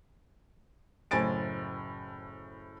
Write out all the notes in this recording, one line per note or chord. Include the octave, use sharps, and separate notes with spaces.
F#1 A2 C5 G#5 A6 D7